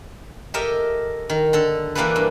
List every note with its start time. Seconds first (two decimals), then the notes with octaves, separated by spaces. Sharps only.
0.54 G4 A4 A#4 D#5 E5
1.30 D#3
1.53 D3 A4
1.95 E3 A#3 D4 G4 A4 B4
2.16 G2